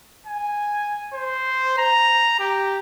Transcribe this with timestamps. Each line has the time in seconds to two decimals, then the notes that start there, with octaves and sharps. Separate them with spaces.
0.27 G#5
1.14 C5
1.78 A#5
2.40 G4